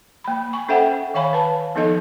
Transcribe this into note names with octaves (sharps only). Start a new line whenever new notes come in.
A#3 B5
G#5 C#6
C#4 A4 C5 E5 F#5 G5
D#3 C#5 F5 G#5 B5
B4 A5
F3 B3 D#4 A4 D#5